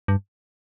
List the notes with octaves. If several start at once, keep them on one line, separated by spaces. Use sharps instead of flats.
G2